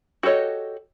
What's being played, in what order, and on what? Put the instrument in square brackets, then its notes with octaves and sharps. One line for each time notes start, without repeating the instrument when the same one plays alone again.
[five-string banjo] F#4 G4 A4 C#5 D#5